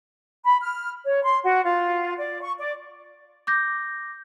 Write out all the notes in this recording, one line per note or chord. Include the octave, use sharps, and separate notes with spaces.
B5
F6
C#5
C6
F#4
F4
D5
C#6
D5
D6 G6 A#6